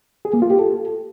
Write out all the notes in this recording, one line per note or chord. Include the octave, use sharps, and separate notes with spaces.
G#4
A#3
F4
G4
A4